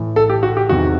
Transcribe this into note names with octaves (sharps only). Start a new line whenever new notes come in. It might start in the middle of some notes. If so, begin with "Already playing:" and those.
Already playing: A2 E3
A4
G4
F#4
G4
E2 C3 D#3 F#4